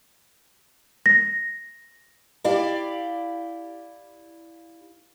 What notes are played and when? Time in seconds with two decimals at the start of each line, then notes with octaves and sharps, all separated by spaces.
1.06 A#6
2.44 E4 G4 D5 F5